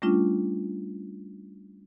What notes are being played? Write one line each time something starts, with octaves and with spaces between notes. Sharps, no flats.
G3 A3 C#4 D4 F4